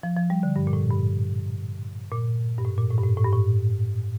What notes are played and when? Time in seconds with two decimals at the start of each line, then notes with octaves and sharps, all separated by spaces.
0.03 F3
0.16 F3
0.30 G3
0.43 D3
0.56 G2
0.67 A#2
0.73 A2
0.91 G2
2.12 A#2
2.58 G2
2.65 A2
2.78 A#2
2.91 A2
2.98 G2
3.03 A2
3.17 A2
3.24 G2
3.33 A2